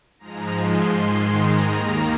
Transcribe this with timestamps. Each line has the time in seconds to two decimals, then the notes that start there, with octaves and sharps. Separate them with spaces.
0.19 G#2 F3 G#3 A#5
0.57 C6
0.95 G#2 D#3 G#3
1.33 A#5
1.69 D#2 D#3 A#3